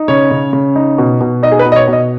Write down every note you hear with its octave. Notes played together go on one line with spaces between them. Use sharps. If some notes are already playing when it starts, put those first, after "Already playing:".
Already playing: D#4
C#3 C#5
C#3
C#3
D#4
B2
B2
D#4 D#5
G#4
B4
B2
D#5
C#5
B2
D#5